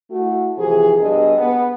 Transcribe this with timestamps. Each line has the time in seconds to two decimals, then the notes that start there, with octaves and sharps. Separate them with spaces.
0.10 A3 E4 F#4
0.58 C3 E3 F3 G#4
0.99 G2 B2 G#4 A4 D#5
1.38 B3